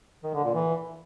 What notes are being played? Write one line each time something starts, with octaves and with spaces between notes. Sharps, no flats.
D#3
D3
A#2
E3